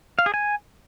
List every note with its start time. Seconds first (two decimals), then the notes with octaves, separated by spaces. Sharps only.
0.19 F5
0.26 G#4
0.34 G#5